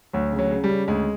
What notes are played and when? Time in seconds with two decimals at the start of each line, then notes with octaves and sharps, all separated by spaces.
0.13 D2 F#3
0.33 C#3
0.39 F#3
0.51 C#3
0.64 G3
0.70 C#3
0.88 D2 G#3